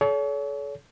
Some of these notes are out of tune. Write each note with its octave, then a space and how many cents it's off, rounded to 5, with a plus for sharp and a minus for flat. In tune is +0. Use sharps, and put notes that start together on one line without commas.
A4 -40 C#5 +40